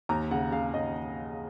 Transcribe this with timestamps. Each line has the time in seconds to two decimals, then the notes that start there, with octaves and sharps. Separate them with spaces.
0.09 D#2 A#5
0.31 C#3 F#5
0.52 C#3 F5
0.74 D#2 D#5